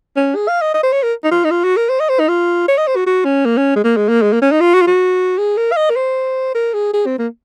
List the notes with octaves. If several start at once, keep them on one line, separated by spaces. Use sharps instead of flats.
C#4
G#4
F5
D#5
D#5
C5
C#5
A#4
D#4
F4
D#4
F4
F#4
A#4
C5
D#5
C5
D#4
F4
C#5
D#5
C5
F#4
F#4
C#4
A#3
C#4
G#3
A#3
G#3
A#3
G#3
A#3
C#4
D#4
F4
F#4
F4
F#4
G#4
A#4
F5
D#5
A#4
C5
A#4
G#4
G#4
C4
A#3